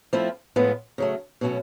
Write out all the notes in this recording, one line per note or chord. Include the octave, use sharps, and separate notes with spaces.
F3 A3 C4 E4
A2 F3 G#3 B3
C#3 F#3 A3
B2 F#3 A3 C#4